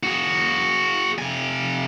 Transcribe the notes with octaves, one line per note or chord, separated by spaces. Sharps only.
F#4 G#4
C3 G#5